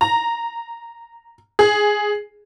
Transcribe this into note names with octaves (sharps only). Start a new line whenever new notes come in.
A#5
G#4